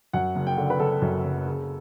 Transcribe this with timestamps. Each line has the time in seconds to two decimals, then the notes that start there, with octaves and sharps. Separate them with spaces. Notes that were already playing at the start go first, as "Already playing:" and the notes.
0.13 F#2 F#5
0.35 F#1
0.47 G5
0.57 D3
0.70 B4
0.79 F#1 A4
1.02 F#2
1.24 F#1
1.46 C#3